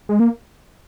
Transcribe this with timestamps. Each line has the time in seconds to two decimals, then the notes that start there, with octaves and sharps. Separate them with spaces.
0.09 G#3
0.20 A#3